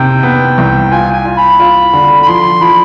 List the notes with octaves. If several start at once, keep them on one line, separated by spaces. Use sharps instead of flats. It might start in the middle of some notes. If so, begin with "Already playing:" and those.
Already playing: C3 D#3 G5
B3
C2
F4 G#5
G#5
F4
B5
F4
D3
B5
F3 C6
F3 B5